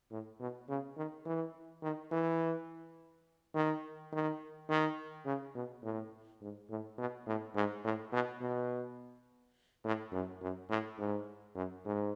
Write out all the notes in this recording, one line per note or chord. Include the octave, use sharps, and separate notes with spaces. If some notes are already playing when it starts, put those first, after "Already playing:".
A2
B2
C#3
D#3
E3
D#3
E3
D#3
D#3
D#3
C#3
B2
A2
G#2
A2
B2
A2
G#2
A2
B2
B2
A2
F#2
F#2
A2
G#2
F#2
G#2